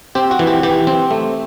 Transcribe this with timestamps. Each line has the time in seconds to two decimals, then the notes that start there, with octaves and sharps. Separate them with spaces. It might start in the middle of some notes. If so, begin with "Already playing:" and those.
0.15 C4 G4
0.31 F#4
0.39 E3
0.47 G4
0.63 E3 G4
0.87 C4
1.11 A3